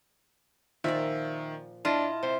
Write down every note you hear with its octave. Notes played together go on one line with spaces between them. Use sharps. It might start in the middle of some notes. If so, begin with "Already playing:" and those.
A#2 D#3 F3 A#4 D5 E5
D4 E4 F4 D#5 A5
C3 C5